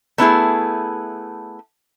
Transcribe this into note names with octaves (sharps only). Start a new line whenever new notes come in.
A3 B3 E4 G#4